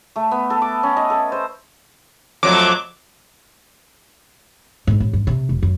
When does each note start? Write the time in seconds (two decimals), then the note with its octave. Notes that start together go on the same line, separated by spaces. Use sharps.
0.16 A3
0.31 B3
0.50 A4
0.62 D6
0.83 C#4
0.97 D#5
1.10 A4
1.32 C5
2.43 F2 F#3 A3 D6
4.87 G#2
5.00 A1
5.13 G2
5.27 C3
5.49 F1
5.63 F#2